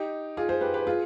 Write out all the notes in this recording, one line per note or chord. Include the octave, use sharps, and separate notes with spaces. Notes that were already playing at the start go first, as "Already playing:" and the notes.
Already playing: D#4 G4
F4 G#4
G#4 C5
G4 B4
G4 B4
F4 G#4